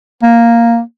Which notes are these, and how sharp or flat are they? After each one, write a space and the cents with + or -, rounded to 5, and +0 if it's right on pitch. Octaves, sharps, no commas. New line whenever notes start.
A#3 +0